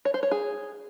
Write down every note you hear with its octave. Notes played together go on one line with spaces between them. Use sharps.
C#5
C5
C#5
G#4